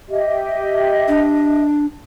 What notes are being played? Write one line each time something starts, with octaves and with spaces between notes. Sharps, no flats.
G4 D#5 E5
D4